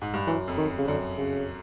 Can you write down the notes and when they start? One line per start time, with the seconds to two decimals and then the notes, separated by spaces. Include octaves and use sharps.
0.02 G#2
0.14 G2
0.27 F#2 E3
0.48 F2
0.57 D#3
0.78 C#3
0.87 F#2 D3
1.18 C#3